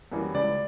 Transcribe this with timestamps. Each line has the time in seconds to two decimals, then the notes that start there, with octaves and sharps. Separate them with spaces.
0.12 F#2 E3 G3 A#3
0.34 C#2 D5